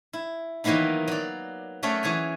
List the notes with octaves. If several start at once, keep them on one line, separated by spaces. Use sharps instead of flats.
E4
D#3 E3 F#3 A#3 B3 D#4
F#3 D5
F#3 A3 C#4 G#4 D5
E3 G#4 C#5 G#5